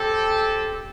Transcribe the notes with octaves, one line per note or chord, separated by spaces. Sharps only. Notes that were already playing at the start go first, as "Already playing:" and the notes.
Already playing: C4 G4 A4